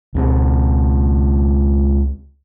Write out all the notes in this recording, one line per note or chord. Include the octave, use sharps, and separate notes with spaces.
C#2 G#3 C4